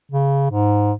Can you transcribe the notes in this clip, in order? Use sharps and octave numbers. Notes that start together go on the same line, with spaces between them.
C#3
G#2